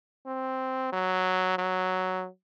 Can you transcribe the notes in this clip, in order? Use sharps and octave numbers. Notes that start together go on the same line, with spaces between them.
C4
F#3
F#3